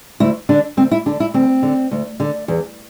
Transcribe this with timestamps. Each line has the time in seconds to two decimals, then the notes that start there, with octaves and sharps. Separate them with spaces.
0.20 D2 E4
0.49 D3 D4
0.77 D2 C4
0.91 E4
1.06 D3 D4
1.20 E4
1.34 D2 C4
1.63 D3
1.91 D2
2.20 D3
2.48 E2